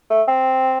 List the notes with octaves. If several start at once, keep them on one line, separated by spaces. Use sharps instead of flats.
A3
C4